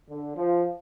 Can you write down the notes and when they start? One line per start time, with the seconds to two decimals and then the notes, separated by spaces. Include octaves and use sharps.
0.09 D3
0.37 F3